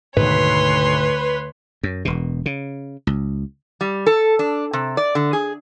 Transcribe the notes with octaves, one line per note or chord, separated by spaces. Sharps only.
D2 G#2 B2 D#3 B4 C#5 C6
F#2
E1 B2
C#3
C#2
G3
A4
D4
C3
D5
D3
G#4